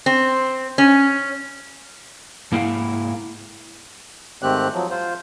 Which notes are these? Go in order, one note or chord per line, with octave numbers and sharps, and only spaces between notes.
C4
C#4
G#2 A#3 E4 A#4 F5 F#5
G#2 D#3 A3 C4 G4 F#6
F3 F#3
F4 C5